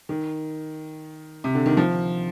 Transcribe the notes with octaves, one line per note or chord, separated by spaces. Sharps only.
D#3
C3
D3
D#3
F3